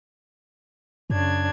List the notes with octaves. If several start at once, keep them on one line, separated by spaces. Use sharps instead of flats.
F#2 C#3 D4 G#6